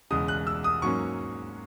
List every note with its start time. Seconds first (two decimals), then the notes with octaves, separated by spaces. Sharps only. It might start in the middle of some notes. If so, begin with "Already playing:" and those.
0.10 E1 E2 C#3 G#3 D#6
0.28 F#6
0.47 E6
0.64 D#6
0.82 G#2 F#3 A#3 C#4 C#6